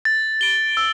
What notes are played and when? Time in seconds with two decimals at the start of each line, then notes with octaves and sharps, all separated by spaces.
0.05 A6
0.41 D7 G7
0.77 E6